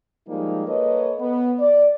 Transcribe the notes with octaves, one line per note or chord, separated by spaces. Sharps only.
F3 G3 G#3 A#3 D#4
A#3 A4 B4 C#5 D#5
B3
D5